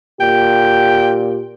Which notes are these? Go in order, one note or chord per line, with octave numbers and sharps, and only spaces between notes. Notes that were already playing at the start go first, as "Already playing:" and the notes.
A#2 G4 G5